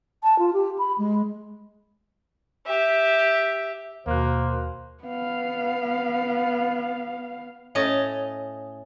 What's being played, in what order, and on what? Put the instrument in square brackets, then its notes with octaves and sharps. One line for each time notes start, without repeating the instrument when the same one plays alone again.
[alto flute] A5
F4
G4
B5
G#3
[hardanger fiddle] G4 E5
[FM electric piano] D#2 F#6 [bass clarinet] B2 [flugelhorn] A#3 [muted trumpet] C5
[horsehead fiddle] B3 F5
[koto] A2 C#4 D#5 A5 A#5